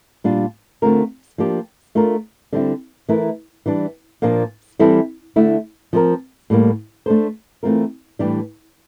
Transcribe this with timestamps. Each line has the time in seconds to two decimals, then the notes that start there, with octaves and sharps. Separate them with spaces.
0.24 A#2 G3 D4 F4
0.82 D3 A3 C4 F4 A#4
1.38 F3 A#3 D4 G4
1.95 A3 D4 F4 A#4
2.52 D3 G3 C4 E4
3.09 E3 A3 E4 A#4
3.66 E3 G3 D4
4.22 A#2 F3 A#3 D4
4.79 E3 G3 C4 E4 A4
5.36 D3 A3 E4
5.93 F3 C4 G4 A#4
6.50 A2 G3 A#3
7.06 A3 D4 A4 C5
7.63 E3 A3 C4 F4 A#4
8.19 A2 E3 G3 D4 G4